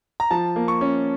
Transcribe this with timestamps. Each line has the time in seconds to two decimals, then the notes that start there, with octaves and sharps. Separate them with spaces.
0.20 A#5
0.31 F3 A5
0.56 A#3
0.68 C#6
0.81 C#4